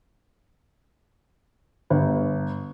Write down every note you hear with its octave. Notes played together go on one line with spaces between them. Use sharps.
G1